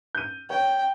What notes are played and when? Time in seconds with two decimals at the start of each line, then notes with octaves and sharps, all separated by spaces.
0.15 G6 D#7
0.50 C#5 G5